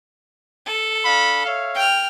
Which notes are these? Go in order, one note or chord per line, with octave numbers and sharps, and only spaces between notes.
A4
D4 F5 B5
C#5 E5 F5
G5 F6